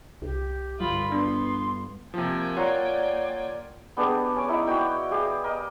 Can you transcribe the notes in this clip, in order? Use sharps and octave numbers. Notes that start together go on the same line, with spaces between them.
C2 G4
G1 G3 F4 B5 D#6
B3 D4 C6
C3 F3 A#3 G5 G#5
F4 C#5 D5 F#5 A#5
B3 D4 G4 G#4
C#4 G#5 D6
D#4 E4 F#5
F#4 D5 G5
G4 G#4 F5
A#4 D#5